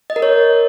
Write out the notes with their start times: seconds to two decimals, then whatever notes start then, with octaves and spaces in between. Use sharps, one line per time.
0.10 D#5
0.16 A#4
0.22 C#5